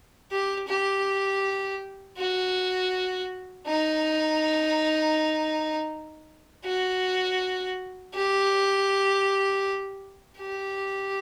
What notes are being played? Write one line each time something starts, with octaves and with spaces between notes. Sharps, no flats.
G4
G4
F#4
D#4
F#4
G4
G4